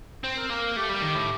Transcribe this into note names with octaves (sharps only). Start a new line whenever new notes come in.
C4 C5
A#4
A#3 A#4
A#4
A3 G4
G3
D#3
A2